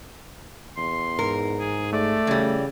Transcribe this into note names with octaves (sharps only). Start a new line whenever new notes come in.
E2 C6
G#2 A#4
G#4
A3 D5
C#3 E3 G3